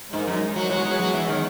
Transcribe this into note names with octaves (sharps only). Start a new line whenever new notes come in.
G#2 G#3 D#4 A#4
F#2
F#3
F#3 G#3 B3 E4 G#4 C#5
F#3
F#3
E3
D#3